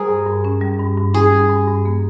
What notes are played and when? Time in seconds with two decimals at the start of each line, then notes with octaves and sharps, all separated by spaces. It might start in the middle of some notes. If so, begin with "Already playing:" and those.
Already playing: G3 G#4 A#4 C5
0.09 G2
0.27 G2
0.45 C#4
0.61 G3
0.80 G2
0.97 G2
1.14 C#4 G#4
1.32 G3
1.49 G2
1.68 G2
1.85 A#3